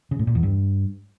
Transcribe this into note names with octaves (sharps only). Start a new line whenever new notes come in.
C#3
A2
A#2
E2
G2